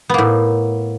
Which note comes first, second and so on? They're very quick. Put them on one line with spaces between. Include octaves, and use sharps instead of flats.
B3 A#3 A2